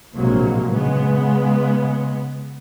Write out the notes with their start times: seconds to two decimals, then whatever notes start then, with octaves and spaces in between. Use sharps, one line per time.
0.15 A#1 A2 C3 F#3 G#3 A#3
0.73 C#3 G#3 B3